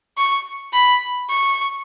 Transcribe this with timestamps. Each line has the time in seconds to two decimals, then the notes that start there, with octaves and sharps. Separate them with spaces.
0.18 C#6
0.73 B5
1.30 C#6